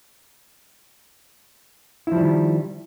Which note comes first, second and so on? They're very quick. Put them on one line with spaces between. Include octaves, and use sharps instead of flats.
E4 F3 G3 D#3